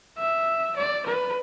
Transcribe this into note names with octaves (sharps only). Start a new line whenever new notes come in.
E5
D5
B4